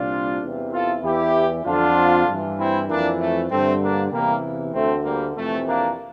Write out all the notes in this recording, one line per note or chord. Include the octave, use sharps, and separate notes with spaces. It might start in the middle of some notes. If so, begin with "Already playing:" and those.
Already playing: C2 A#2 D4 F4
E2 C3 E3
F4 A4
E2 E3 E4 G4
F2 D3 D4 F4
G2 E3
C4 E4
F2 E3 A#3 D4
A3
G2 D3 A3 C4
A#3 D4
E2 C3 E3 G3 A#3
D2 D3 A3 C4
G3 A#3
F2 C3 E3 A3
A#3 D4